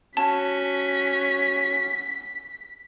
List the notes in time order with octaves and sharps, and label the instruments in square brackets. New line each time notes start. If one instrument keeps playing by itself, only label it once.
[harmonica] C#4 F#4 [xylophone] A5 [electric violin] B6